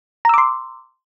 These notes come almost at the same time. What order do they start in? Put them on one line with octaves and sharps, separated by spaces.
A#5 E6 D6 C6